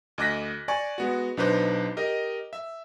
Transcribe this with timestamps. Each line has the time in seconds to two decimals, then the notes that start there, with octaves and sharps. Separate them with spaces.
0.18 D2 D#5 D6 F#6 A#6 B6
0.68 D5 G#5 C#6
0.98 G#3 B3 F#4
1.37 B1 D4 D#4 B4 C5 D6
1.97 G4 A#4 D#5
2.53 E5